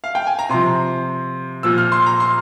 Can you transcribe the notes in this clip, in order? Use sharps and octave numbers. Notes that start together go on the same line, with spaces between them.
F5
G5
G#5
A#5
C3 F3 C6
A#2 F3 E6
F6
C6
A#5
C6